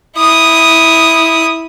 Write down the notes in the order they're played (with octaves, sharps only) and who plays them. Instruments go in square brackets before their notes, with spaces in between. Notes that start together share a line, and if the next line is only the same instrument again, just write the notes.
[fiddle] E4 D#6